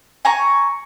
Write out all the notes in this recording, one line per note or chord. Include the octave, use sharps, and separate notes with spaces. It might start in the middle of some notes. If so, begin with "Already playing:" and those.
G#5 A#5 C#6